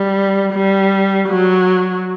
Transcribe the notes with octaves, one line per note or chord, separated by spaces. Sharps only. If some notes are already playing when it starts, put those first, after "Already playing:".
Already playing: G3
G3
F#3